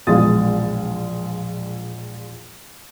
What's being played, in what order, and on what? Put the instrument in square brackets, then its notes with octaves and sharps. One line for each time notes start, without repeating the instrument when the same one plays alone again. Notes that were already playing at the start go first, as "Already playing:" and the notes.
[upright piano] E1 A#1 G#3 F4 D#6 A6